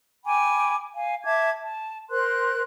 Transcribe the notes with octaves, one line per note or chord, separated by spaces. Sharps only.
G5 G#5 B5 D6
F5 G#5
E5 A5 D6 G#6
A5
A#4 C5 C6 F#6